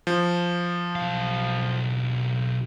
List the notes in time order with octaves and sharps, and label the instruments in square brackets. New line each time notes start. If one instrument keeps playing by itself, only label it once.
[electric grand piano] F3
[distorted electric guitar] B1 F5